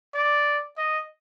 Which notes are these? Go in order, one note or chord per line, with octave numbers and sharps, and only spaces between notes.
D5
D#5